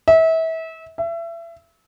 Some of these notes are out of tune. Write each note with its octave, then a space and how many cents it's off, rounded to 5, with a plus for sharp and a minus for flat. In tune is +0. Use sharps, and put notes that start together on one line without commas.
E5 -30
E5 +30